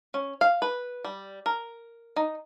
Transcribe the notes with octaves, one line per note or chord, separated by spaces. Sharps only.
C#4
F5
B4
G3
A#4
D#4